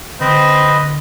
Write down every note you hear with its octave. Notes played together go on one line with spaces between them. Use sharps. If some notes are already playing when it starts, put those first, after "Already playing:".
D3 C4 B4 D#5 B5